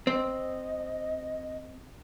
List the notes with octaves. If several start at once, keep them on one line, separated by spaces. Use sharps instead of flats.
C4 D#5